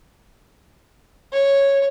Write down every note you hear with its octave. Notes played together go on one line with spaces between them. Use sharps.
C#5